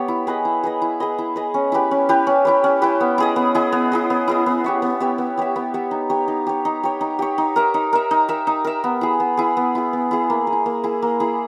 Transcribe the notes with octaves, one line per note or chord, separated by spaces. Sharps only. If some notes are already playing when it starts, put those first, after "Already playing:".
Already playing: B3 G4 C#5
E4
G#4 B4 D#5
E4
G#4 B4 D#5
E4
G#4 B4 D#5
E4
G#4 B4 D#5
C#4
E4 G4 B4
C#4
E4 G4 B4
C#4
E4 G4 B4
C#4
E4 G4 B4
B3
E4 G#4 D#5
B3
E4 G#4 D#5
B3
E4 G#4 D#5
B3
E4 G#4 D#5
B3
G4 C#5 E5
B3
G4 C#5 E5
B3
G4 C#5 E5
B3
G4 C#5 E5
D#4
G4 C#5
D#4
G4 C#5
D#4
G4 C#5
D#4
G4 C#5
D#4
A#4 E5
D#4
A#4 E5
D#4
A#4 E5
D#4
A#4 E5
B3
E4 G#4
B3
E4 G#4
B3
E4 G#4
B3
E4 G#4
A#3
G#4
E4
A#3
E4 G#4
A#3
E4 G#4